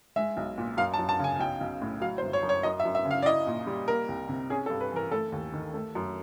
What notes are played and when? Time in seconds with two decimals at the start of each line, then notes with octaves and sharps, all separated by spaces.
0.16 G#3 E5
0.37 B1
0.58 A#2
0.77 F#2 F5
0.94 A5
0.99 F#2
1.09 A5
1.19 C#3 G#5
1.39 B1 G5
1.61 B1
1.82 A2
2.01 F#3 F5
2.18 C5
2.22 G1
2.33 C#5
2.43 F#2
2.49 C#5
2.63 F#2 D#5
2.80 E5
2.85 F#2
2.95 E5
3.05 C#3
3.11 F5
3.22 D5
3.25 E4 D#5
3.47 A#2
3.67 G3
3.88 A#3 A#4
4.08 C2
4.29 C3
4.50 C#4 G#4
4.66 A4
4.70 G2
4.81 B4
4.92 E3 A#4
5.11 A3 A4
5.32 D#2
5.53 D#3
5.74 A3
5.95 F#2